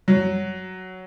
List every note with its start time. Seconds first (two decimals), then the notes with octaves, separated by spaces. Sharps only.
0.08 F#3